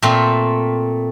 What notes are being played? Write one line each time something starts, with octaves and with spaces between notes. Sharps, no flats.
A#2 A3 C4